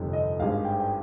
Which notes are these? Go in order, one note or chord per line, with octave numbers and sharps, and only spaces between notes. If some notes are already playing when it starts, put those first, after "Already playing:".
Already playing: G1 F2 C3 D#3
D#5
G#1 G2 D#3 G#3 F5
G5
G5